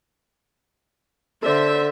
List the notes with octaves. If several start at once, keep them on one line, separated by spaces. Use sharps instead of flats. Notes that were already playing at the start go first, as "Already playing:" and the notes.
D3 A4 C5 D5 E5